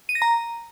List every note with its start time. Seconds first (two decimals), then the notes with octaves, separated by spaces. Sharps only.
0.09 D#7
0.15 A#6
0.22 A#5